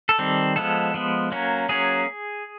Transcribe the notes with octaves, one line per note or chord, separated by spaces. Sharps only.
A4
D#3 G3 C4
F3 G#3 B3 A4
F3 G#3 B3
F#3 A#3 C#4
F#3 A#3 C#4 G#4